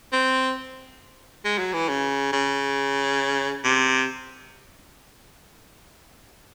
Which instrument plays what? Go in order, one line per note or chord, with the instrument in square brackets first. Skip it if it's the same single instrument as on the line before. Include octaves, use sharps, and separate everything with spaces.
[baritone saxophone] C4
G#3
F#3
E3
C#3
C#3
C3